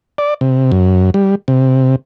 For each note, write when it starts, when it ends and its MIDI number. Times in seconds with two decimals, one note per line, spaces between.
0.18 0.34 74
0.41 0.71 48
0.72 1.10 42
1.14 1.35 55
1.48 1.96 48